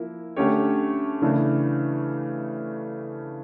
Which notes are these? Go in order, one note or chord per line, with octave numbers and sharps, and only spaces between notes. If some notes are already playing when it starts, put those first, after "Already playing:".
Already playing: F3 A#3 E4
D3 A3 C#4 G4 C#5
C#3 E3 A3 D4